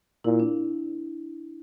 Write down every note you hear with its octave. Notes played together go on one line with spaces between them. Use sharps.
A#2 E4
D4